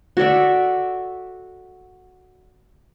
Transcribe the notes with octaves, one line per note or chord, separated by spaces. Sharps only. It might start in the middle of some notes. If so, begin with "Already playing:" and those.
F#4 A4 D5 E5